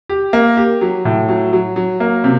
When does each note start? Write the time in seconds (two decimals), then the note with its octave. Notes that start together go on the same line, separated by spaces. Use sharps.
0.09 G4
0.33 A#3
0.57 G4
0.81 F#3
1.05 A2
1.29 F#3
1.53 F#3
1.76 F#3
2.00 A#3
2.24 C3